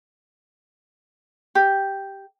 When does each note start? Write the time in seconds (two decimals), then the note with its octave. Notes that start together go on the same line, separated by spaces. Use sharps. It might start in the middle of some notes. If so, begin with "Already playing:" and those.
1.55 G4